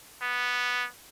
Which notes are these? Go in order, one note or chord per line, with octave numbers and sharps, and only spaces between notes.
B3